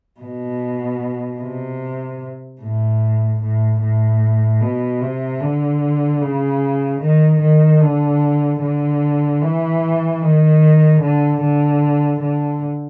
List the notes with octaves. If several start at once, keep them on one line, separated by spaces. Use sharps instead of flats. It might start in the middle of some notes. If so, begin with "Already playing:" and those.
B2
C3
A2
A2
A2
B2
C3
D3
C#3
D#3
D#3
D3
D3
E3
D#3
D3
D3
D3